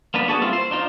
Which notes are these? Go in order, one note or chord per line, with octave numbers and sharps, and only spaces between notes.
A#3 B3 D4 B4
B3 F#4 G#4 A4 A5
G3 A#3 C4 E4 F4
C5
D4 D#4 F4 C5